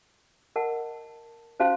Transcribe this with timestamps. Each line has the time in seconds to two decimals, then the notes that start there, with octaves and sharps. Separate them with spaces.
0.56 A#4 D#5 F#5 A5
1.60 C#4 F#4 C5 F5 A5